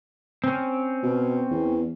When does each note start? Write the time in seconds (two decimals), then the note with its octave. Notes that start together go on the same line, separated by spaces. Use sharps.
0.44 C4 C#4
1.03 B2
1.51 E2